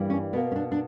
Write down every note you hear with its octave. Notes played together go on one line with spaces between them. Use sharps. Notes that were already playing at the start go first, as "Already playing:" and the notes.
Already playing: G2 E3 G3 A#3
C#4
B2 A#3 B3
C#4
D4
D4